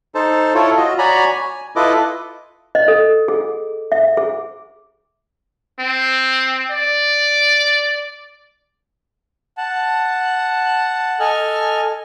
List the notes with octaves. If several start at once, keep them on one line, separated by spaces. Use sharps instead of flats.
D#4 A4 C5 A5
E4 F4 A4 C#5
F4 F#4 D#5
F#4 C#5 D5 G#5 A#5 B5
G#5
E4 F4 A4 B4 D#5 D6
D#5
A4
G#4
E5
G#4
C4
D5
F#5 A5
A4 D#5 G#5 F6